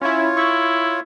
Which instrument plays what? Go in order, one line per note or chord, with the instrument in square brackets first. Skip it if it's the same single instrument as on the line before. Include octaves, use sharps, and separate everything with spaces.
[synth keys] C#4 E4 [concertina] F4 C#5
[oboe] E4 [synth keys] C#6